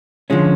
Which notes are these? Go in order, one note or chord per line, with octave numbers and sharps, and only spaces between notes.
D3 F3 G#3 C#4